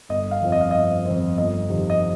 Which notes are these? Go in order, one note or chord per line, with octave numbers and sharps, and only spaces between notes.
G1 D#5
F5
F2 F3 C4
D#5
F5
G1 D#5
F2 F3 C4
G1 D#5
F2 C3 D#3
D#5